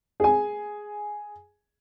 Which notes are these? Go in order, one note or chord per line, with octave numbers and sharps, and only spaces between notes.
G#4 G#5